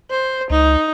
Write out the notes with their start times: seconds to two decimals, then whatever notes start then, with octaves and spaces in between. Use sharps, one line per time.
0.11 C5
0.50 C#2 D#4